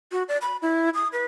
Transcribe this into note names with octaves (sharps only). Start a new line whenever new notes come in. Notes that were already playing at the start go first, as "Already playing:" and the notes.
F#4
D5
B5
E4
D#6
B4